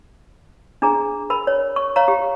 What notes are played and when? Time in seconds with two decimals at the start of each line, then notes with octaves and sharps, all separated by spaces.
0.82 D4 G#4 A#5
1.30 A#4 B5
1.47 C#5
1.76 C#6
1.96 C#5 F5 A#5
2.08 G4